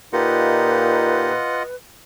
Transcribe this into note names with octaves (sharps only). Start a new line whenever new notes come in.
A#2 D#4 F4 G4 B4 D#5 F#5